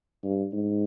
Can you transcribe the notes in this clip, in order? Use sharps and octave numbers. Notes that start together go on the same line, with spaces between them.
G2
G#2